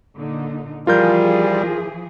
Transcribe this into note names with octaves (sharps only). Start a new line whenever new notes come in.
A#2 D3 D#4
E3 F3 G3 F4 G#4 A#4 G6